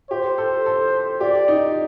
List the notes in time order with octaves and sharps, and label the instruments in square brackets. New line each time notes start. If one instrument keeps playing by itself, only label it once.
[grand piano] G4 [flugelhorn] C5
[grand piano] A4
A4
[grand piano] G4 [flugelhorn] D5
[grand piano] D#4